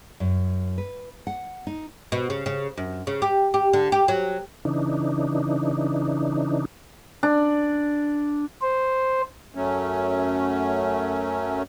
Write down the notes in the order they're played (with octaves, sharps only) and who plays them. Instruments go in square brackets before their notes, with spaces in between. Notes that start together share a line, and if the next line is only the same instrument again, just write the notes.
[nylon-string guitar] F#2
B4
F#5
D#4
[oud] B2
C#3
C#3
F#2
C#3
G4
G4
D3
G4
F#3
[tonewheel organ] C#3 E3 D4 D#4
[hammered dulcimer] D4
[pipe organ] C5
[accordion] F#2 F#3 A3 C#4